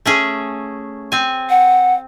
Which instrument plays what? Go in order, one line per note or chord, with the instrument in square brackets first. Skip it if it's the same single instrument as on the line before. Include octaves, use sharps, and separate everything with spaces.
[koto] A3 C#4 G#4
C4 G#5
[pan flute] F#5